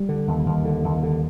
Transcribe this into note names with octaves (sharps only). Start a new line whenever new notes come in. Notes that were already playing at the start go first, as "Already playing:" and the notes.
Already playing: G3
D3
D#2
D#2
D3
D#2
D3